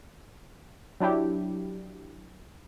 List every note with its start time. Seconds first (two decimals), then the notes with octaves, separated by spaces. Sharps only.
1.00 F#3 D4 E4 G4